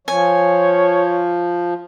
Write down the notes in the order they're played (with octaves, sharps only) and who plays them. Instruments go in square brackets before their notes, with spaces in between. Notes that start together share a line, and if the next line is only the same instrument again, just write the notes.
[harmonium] F3 [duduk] C#5 [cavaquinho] G#5